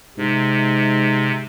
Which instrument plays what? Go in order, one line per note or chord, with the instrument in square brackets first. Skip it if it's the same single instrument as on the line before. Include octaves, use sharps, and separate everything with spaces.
[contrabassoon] G#2 [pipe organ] C3